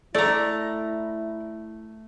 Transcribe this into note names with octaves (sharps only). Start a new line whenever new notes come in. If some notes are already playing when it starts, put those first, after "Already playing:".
A3 E4 D5 A#5